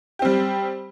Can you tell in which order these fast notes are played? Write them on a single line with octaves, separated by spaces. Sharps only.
G4 C4 G3